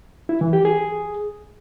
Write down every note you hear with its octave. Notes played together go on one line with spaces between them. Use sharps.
E4
E3
G4
G#4